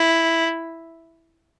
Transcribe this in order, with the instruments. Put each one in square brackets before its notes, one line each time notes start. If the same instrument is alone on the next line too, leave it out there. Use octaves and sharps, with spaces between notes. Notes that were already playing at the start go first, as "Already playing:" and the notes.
Already playing: [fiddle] E4